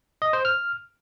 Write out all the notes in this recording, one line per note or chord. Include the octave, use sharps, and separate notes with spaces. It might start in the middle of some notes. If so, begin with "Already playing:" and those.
D#5
C5
F6